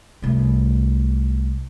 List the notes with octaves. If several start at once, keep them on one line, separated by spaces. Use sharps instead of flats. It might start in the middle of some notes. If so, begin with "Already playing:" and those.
C2 A3